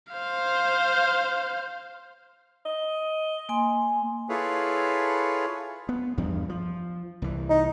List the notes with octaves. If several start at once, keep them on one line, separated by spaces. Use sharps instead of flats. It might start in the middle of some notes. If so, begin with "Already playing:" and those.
C5 F5
D#5
A#3 G#5 C6
E4 F4 G#4 A4 B4 C#5
B3
E2 G2 F3
F3
C2 E3
D#4